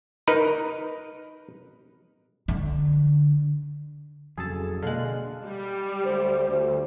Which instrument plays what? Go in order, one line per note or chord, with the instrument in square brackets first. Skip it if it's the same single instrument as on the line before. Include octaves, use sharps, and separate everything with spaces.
[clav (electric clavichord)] D#4 A#4 B4
[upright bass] D3
[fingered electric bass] F2 C#3 F#3 [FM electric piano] G#4 A4 A5
[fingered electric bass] B2 A#3 [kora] D3 G#3 [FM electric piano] F5 F#6
[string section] G3
[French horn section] D2 C5
D2